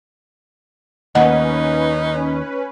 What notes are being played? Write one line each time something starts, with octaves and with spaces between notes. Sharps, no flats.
D#2 C#4 D#4 B4 D#5 F#5